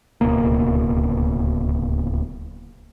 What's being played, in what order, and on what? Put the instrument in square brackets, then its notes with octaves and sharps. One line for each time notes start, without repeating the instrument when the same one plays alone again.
[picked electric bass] D1 C#2 B2 A#3